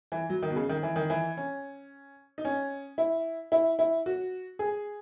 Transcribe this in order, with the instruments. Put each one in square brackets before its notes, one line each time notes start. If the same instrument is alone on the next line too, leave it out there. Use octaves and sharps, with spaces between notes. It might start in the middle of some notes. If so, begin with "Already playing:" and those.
[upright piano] E3
F#3
D#3
B2
C#3
D#3
E3
D#3
E3
C#4
D#4
C#4
E4
E4
E4
F#4
G#4